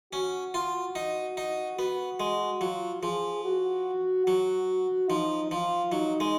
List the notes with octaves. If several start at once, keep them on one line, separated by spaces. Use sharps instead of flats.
C#4 F#4
F4
D#4
D#4
B3 F#4
G#3
F#3 F4
F3 G#4
F#4
F#3 F#4
F3 D#4
F3 F4
F#3 D#4
G#3